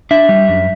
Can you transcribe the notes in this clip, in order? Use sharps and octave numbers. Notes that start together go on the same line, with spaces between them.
D4 E5
G3
F#2